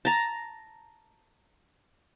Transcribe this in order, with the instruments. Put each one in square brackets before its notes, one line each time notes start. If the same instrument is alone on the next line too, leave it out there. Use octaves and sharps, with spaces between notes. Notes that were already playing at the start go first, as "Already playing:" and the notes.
[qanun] A5 A#5